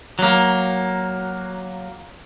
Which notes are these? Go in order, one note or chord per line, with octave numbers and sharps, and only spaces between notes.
F#3 A#3